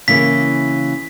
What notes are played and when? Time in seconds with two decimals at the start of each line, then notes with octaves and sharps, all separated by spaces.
0.08 C#3 E3 A#3 B6